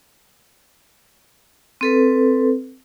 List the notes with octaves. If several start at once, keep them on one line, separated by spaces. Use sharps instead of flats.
C4 A4 B4